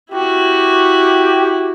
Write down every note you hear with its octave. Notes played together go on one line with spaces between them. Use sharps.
E4 F#4 G4